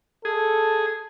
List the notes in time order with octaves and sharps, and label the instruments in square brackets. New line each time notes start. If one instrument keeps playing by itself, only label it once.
[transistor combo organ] G#4 [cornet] A4